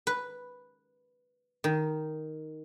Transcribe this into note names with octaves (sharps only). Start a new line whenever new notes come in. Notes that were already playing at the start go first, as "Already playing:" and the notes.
B4
D#3